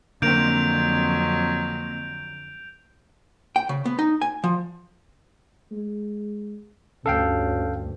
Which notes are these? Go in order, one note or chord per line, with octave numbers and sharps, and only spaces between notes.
F2 D3 F#3 A#3 C4 G6 D7 F7
G5
C#3
B3
D#4
G#5
F3
G#3
D2 G2 C#4 A4 F5 G5